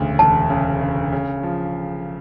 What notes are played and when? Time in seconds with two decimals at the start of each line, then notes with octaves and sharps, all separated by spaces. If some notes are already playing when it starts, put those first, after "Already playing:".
Already playing: E1 D2 C#3
0.19 E1 A5
0.50 C#3
0.81 C#3
1.12 C#3
1.43 F3